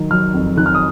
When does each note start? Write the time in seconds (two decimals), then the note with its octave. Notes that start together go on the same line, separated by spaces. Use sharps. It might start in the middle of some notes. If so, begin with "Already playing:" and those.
Already playing: D#3 F#3
0.11 F#3 F6
0.34 F2
0.57 D#3 F#6
0.66 F6
0.75 D#6